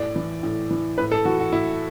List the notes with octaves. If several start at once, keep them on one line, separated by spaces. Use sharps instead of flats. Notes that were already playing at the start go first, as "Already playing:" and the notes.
Already playing: A2 D5
E3
A2
E3
A2 B4
A4
E3 F#4
F#4
A2 E4